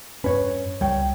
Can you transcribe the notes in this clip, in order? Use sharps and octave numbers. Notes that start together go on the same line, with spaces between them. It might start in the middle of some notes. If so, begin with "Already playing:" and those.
G2 C#4 B4 C#5
C#2 G3 C#5 G5